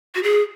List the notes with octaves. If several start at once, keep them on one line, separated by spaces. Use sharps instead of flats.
F#4
G#4